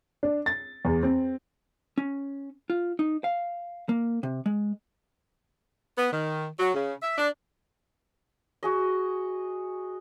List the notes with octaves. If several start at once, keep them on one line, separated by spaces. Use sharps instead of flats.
D4
A6
E2
C4
C#4
F4
D#4
F5
A#3
C3
G#3
B3
D#3
F#3
C#3
E5
D4
F#4 G#4 D#5